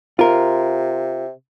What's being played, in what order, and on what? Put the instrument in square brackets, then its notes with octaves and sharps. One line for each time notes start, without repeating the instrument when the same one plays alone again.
[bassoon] C3 [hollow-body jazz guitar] F4 A#4